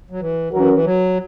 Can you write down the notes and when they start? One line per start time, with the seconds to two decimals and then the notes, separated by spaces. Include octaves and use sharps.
0.10 F#3
0.20 E3
0.52 E3 F#3 C#4 F#4 A#4
0.73 E3
0.84 F#3